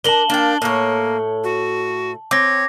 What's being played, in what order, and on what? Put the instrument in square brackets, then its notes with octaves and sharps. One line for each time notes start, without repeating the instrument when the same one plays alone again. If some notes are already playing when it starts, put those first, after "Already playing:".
[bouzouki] D4 A#4 [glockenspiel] A5 F#7 G7
[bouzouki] A#3 G5 [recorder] D4
[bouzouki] A2 C#5 [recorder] A#3
[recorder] F#4
[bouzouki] C4 [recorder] C#5 [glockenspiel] D6 A#6